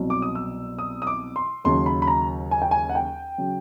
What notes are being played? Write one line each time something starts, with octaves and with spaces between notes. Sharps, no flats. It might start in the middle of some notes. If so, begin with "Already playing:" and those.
Already playing: C2 B2 F#3
D6
D#6
E6
D#6
D#6
D6
C6
D#2 C#3 F#3 C6
B5
B5
A#5
G#5
G5
G#5
F#5
G5
C#3 F#3